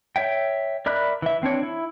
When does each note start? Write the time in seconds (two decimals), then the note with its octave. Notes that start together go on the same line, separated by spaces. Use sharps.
0.16 C#5 E5 G5
0.86 A#4 D5 E5 B5 F#6
1.22 E3 E5
1.42 E3 C4 D4 C#5
1.63 E4